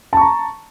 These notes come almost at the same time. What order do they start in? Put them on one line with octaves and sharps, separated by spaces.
A5 C#6 A#5